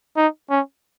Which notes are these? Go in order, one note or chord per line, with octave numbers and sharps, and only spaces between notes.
D#4
C#4